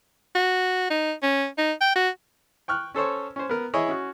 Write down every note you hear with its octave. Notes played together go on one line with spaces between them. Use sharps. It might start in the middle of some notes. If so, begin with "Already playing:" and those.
F#4
D#4
C#4
D#4
G5
F#4
G5 C#6 F6 F#6
C#4 A4 C5 C#5
C#4 C5
B3 A#4
E3 E4 G#4 C#5 D#5
C#4 F#4